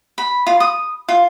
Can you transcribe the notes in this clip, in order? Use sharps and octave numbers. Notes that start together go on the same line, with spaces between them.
B5
F4
D#6
F4